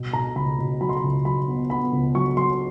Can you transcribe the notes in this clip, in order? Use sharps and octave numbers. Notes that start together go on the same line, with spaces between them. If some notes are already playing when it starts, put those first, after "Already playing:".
Already playing: B2
B2 A#5
C#2 B5
B2
F#3 B5
C6
B5
C#2
F#3 B5
B3
B3 B5
C#2
F#3 C#6
F#3 C6